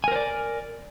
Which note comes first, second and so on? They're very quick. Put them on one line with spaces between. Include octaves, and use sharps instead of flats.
G#5 A#4 C5 D5